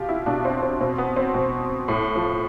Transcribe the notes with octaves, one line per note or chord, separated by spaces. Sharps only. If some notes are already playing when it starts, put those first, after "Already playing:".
Already playing: B2 F4 G4
E4
B2 D4
C4
C4
B2 C4
B3
C4
B2
A2
F3